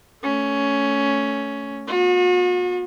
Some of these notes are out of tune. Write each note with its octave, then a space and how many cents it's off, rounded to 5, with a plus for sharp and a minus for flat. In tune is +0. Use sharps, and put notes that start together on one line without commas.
A3 +0 C#4 +10
B3 -20 F#4 -45